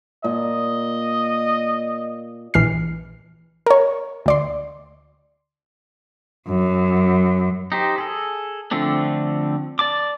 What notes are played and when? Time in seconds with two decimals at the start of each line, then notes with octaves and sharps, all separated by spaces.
0.24 A#2 D#5
2.54 A#1 E3 F6 C7
3.66 A#4 C#5
4.26 D2 D5 C6
6.48 F#2
7.72 D#4 G4 C5
7.98 G#4 A4
8.71 D3 F3 A3 C4 D4
9.79 D5 A5 D6